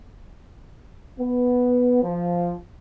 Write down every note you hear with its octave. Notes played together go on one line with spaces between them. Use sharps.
B3
F3